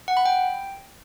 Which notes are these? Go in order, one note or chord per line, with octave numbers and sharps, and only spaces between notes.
F#5
B5
G5